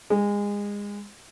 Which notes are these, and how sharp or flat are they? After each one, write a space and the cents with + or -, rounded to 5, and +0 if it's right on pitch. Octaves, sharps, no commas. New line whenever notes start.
G#3 -25